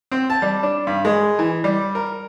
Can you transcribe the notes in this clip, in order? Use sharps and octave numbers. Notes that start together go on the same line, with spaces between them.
C4
A5
G3
D4
G2
G#3
E3
G3
A#4